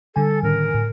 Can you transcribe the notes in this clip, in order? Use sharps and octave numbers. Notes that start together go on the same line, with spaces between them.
D3 G3 A4 G#5
A2 D#3 C#4 A#4
A2